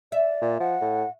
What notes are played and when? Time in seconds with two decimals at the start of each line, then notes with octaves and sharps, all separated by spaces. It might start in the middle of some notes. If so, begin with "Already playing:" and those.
0.12 D5 E5
0.41 A#2
0.60 F3 F#5
0.81 A2